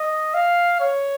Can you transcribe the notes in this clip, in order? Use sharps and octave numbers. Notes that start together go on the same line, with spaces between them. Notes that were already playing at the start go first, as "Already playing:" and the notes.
Already playing: D#5
F5
C#5